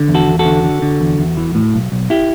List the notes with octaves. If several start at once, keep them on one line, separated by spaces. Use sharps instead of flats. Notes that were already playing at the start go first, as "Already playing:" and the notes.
Already playing: D3
E2
F#4 A4
E2
F#4 A4
D3
D3
D3
E2
E2
E3
A2
B1
B1
E4 G4